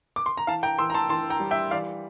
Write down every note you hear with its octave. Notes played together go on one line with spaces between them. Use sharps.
D6
C6
A#5
E3 F5 A5
G5 A#5
E3 C6 E6
A#5
A5 C6
E3 A5 C6
G5 A#5
G3
E5 G5
E3 D5 F5